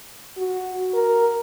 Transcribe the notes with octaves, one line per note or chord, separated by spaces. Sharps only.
F#4
A#4